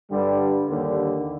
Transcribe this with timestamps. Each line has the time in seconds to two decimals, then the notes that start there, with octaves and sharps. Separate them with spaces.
0.11 G2 D3 G3
0.67 D#2 D3 G3